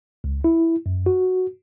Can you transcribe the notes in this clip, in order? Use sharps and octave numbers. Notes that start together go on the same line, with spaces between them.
C#2
E4
F#2
F#4